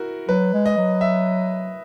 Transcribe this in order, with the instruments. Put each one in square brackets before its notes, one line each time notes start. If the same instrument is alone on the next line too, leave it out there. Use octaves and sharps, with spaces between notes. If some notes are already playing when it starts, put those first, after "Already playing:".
Already playing: [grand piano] E4 F#4 A#4
[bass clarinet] F#3 [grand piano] B4
[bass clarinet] G#3
[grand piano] D#5
[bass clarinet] F#3
[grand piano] E5